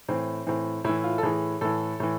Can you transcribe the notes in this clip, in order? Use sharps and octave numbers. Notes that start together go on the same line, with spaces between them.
A2 E3 C4
A2 E3 C4
A2 E3 E4
F4
A4
A2 E3 G#4
A2 E3 A4
A2 E3